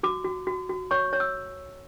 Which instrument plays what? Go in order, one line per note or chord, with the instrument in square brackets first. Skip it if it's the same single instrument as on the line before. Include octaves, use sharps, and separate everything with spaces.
[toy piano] F#4 D6
F#4
F#4
F#4
C#5 C#6
C#5
E6